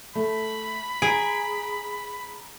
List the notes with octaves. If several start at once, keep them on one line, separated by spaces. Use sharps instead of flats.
A3 B5
G#4 A#5 B6 D7